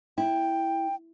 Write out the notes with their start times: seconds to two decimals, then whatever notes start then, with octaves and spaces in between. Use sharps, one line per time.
0.18 E4 G5